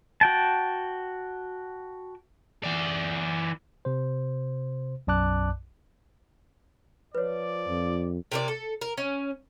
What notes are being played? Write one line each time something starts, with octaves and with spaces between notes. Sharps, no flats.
F#4 G5 A5
E3 D5
C3 C5
B1 F#2 D5 A5 D6 F#6
F3 B4 C#5 D5
F2
C3 A#3 D5
A4
A#4
C#4